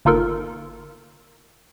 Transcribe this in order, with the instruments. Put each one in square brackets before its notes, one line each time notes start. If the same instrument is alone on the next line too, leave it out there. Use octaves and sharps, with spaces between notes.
[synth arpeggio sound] G1 A#3 D#4 F4 A4 A#4